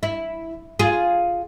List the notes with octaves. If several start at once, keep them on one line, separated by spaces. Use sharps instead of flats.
E4
F4 G#4